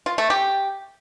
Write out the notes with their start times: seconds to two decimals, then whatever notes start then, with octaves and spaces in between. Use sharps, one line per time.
0.06 F4
0.18 A3
0.30 G4